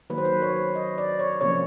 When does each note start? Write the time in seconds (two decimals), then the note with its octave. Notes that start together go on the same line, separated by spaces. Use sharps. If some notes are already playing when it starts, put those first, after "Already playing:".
0.10 D#3 F#3 A#3 B4
0.18 C5
0.25 B4
0.42 C#5
0.75 D#5
0.98 D5
1.19 C#5
1.41 C3 F3 A#3 C#4 C#5